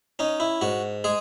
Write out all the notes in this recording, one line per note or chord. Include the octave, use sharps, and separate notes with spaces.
C#4 D#4
E4
G#2 F#4
G#3 G#4